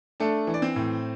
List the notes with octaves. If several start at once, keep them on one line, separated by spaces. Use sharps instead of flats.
A3 D4 A4
E3
D5
C4 C5
A2